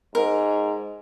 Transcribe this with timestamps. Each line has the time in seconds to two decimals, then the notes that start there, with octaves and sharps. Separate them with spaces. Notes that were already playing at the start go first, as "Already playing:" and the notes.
0.15 G#2 A#4